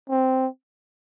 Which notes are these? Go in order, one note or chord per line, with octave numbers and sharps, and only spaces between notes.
C4